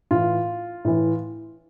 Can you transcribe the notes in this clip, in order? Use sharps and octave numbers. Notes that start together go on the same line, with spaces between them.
A2 E3 F4
A2 E3